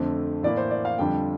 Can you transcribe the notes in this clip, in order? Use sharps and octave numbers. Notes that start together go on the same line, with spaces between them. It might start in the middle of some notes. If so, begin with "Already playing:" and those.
Already playing: F2 D3 A3 C4
A2 E3 A#3 E4 D5
C5
D5
F5
F2 D3 G3 D4 F4 G5